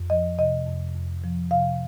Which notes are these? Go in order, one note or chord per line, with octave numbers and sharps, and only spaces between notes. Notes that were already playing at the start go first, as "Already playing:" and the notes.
Already playing: F2
F3 D#5
C3 D#5
F2
F2
F3
C3 F5